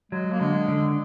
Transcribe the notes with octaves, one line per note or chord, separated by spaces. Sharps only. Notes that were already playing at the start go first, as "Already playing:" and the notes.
F#3 G#3
A#3
D3 G#3
D3